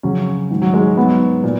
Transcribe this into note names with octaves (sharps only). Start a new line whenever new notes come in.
F2 C#3 F#3 C#4
G#2 D#3 F#3
F#3
G#3
G#2 F#3 B3
A#2